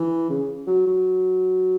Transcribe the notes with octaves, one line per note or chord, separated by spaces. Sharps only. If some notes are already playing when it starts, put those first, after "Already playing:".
Already playing: E3
C#3
F#3
F#3